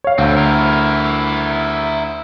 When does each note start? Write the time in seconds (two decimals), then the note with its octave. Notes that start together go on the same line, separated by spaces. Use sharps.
0.04 C#5 F5
0.18 D2 D3 C4
0.37 E4 A#4